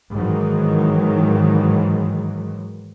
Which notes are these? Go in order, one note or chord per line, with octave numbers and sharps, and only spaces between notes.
G#2 D#3 E3 F#3